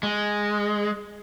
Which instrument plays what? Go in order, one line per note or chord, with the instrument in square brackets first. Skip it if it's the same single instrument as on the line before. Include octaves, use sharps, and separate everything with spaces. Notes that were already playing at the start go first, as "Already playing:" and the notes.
[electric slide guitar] G#3